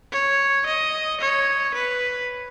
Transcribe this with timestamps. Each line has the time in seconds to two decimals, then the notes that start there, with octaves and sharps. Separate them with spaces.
0.12 C#5
0.66 D#5
1.21 C#5
1.74 B4